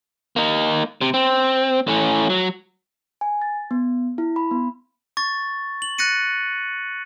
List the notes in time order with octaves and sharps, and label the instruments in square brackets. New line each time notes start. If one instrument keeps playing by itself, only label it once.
[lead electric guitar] A#3 D#4
C3
C4
A2 C#4
F#3
[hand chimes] G#5
A6
B3
E4
B5
B3
[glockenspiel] C#6 A6
F#7
F#6 A6 A#6 C#7 D#7